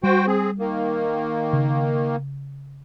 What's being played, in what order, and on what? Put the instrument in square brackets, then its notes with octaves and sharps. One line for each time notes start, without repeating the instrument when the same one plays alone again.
[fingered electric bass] G3 [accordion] F#4 C5 G5
[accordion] C4 G#4
D#3 A#3
[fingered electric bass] C#3